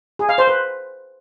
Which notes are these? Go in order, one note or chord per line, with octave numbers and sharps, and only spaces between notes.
G#4
F5
C5
B4